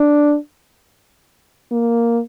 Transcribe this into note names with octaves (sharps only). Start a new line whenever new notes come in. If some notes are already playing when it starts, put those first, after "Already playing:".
Already playing: D4
A#3